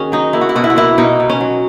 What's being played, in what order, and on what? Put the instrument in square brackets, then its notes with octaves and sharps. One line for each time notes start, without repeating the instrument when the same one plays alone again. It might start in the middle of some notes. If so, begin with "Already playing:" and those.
Already playing: [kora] D#3 C#4 F#4 G#4
F#3 D#4
A#3 E4
F#4
E4
B2 F#4
E4
F#4
A#3 E4
B2 D#4
B2
C#4
F#3